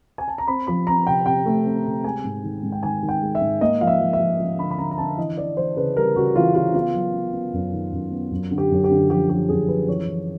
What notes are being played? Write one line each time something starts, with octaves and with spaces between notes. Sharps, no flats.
G#5
A5
A#5
C4 B5
F3 B5
C4 A#5
C3 G5
C3 G5
A3
C4
C3
G#3 G#5
G#2
D#3
G#2
G5
D#3 G#5
D#3
G5
G#3
E5
G#2
A#3 D#5
F3 F5
E5
F3
E5
F3
F3
D3 B5
B5
D3 A#5
A#5
D3 A5
E3 D#5
E3 D5
E3 C5
C#3 B4
G3 A#4
C#3 F#4
E3 F4
C#3 F4
B3 F4
F#3
B3
B3
F#2
D#3
F#2
B3
F#2
D3
G4
F#2
G4
D3
F3 G4
F3 G4
F#2 G#4
F3 B4
E3 C#5
E3